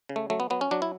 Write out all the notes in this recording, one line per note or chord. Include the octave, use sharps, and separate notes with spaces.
C#3
A3
F#3 A3
B3
F#3 B3
C#4
F#3 D4
E4